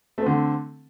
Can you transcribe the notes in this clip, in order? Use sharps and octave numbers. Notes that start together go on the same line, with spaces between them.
D3 A3 C4